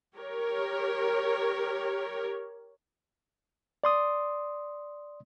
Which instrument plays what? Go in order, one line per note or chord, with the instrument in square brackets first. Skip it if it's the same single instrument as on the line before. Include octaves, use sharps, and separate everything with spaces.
[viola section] G4 A#4 C#5
[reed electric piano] D5 C6 D#6